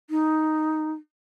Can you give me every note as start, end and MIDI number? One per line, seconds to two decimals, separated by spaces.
0.10 0.92 63